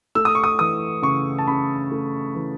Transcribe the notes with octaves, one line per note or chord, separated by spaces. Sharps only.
A3 E6
D#6
C#6
D#6
E3 D#6
C#3 C#6
A5
C#3 B5
A3
E3